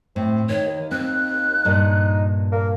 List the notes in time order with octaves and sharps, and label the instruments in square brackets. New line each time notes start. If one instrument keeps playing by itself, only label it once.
[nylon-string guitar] A2 [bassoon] C4
[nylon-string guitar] D#3 [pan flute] C#5
[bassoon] D#2
[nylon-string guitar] C4 [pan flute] F#6
[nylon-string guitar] G2 A#2 [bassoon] D#4
[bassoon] A#3